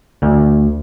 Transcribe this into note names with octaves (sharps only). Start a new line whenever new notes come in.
D2